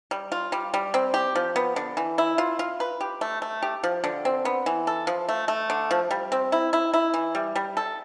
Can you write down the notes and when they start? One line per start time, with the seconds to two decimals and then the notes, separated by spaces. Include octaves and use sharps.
0.11 G3
0.32 F4
0.52 G3
0.74 G3
0.94 C4
1.14 G4
1.36 F3
1.56 B3
1.76 D3
1.97 E3
2.18 E4
2.38 F4
2.59 F4
2.80 B4
3.01 G4
3.21 A3
3.42 A3
3.62 G4
3.84 F3
4.04 D3
4.25 C4
4.45 B3
4.66 E3
4.87 A4
5.07 F3
5.29 A3
5.48 A3
5.70 D3
5.91 F3
6.11 G3
6.32 C4
6.52 E4
6.73 E4
6.94 E4
7.14 E3
7.35 G3
7.56 G3
7.77 A4